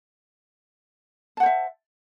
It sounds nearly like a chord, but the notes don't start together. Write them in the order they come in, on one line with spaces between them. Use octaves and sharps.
A5 F#5 C5 E5